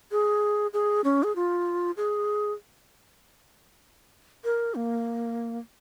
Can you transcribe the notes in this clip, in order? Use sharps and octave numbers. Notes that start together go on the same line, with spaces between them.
G#4
G#4
C#4
G#4
F4
G#4
A#4
A#3